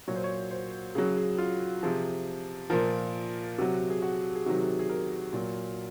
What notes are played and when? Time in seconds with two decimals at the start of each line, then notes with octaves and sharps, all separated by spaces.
0.08 A#2 F#3 C#5
0.16 C5
0.24 C#5
0.51 C5
0.95 C#3 F#3 G#4
1.17 G#4
1.38 F4
1.83 C3 F3 G#4
2.70 A#2 F3 A#4
3.58 C3 F#3 F#4
3.90 G#4
4.02 F#4
4.35 G#4
4.46 C3 D#3 F#3 F#4
4.57 G#4
4.79 G#4
4.89 A#4
5.33 A#2 F#3